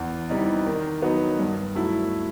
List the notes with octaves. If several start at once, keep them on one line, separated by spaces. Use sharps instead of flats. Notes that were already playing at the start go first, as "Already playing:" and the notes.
Already playing: E2
C3 E3 G3 D#4
D#3
F#3 B3 D#4
G2
F#3 A3 E4